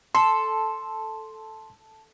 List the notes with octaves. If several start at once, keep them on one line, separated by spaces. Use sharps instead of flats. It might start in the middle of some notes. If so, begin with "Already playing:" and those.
A4 C6